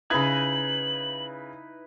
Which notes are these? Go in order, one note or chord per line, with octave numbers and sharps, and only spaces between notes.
C#3 D#4 E4 B4 G#6 F#7